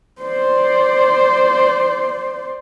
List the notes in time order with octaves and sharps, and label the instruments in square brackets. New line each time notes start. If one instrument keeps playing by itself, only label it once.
[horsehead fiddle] C5 D5